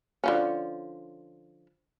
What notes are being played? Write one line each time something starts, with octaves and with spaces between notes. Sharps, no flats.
D3 F3 C#4